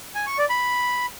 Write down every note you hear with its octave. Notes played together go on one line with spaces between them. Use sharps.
G#5
C#6
D5
B5